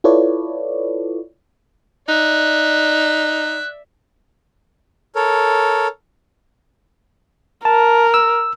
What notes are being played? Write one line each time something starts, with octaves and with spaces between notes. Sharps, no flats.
E4 F4 A4 B4 C#5 D5
D#4 D5 E5 F#6
A4 A#4 C#5
A#4 A5
E6